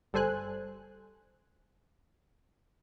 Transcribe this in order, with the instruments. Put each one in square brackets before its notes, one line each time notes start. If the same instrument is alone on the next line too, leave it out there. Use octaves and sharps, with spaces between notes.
[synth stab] G1 G3 A4 C5 G#5 F#6